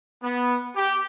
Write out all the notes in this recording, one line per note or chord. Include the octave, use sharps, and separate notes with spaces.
B3
G4